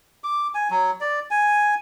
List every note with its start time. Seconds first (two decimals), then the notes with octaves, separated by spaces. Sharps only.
0.24 D6
0.55 G#5
0.70 F#3
1.01 D5
1.31 G#5